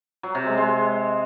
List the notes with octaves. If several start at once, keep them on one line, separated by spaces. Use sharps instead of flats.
F#3
C3
G#3
G#3